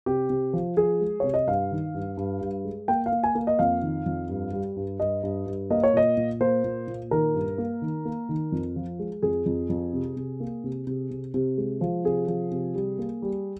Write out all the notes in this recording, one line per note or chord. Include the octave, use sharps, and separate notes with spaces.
C3 G4
C3
F3
F3 G#4
G#3
C3 C#5
D#5
G2 F5
D#3
G2
G2
G2
G#3
A#3 G5
F5
A#3
G#5
A#3
D#5
F2 F5
D#3
F2
G2
G3
G2
G2 D#5
G2
G2
A#3 D#5
C#5
A#2 D#5
A#2
A#3 C5
A#2
A#2
D#3 A#4
G2
A#3
D#3
A#3
D#3
F2
F3
G#3
F2 G#4
F2
F2
C3
C3
A#3
C3
C3
C3
C3
G#3
F3
C3 G#4
F3
C3
G3
A#3
G3